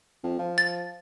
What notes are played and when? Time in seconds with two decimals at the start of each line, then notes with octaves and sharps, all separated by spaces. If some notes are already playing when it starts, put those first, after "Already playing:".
0.24 F2
0.39 F3
0.58 A6